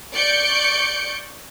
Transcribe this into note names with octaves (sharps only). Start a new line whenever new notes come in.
D5 C#6 G6 C#7 D7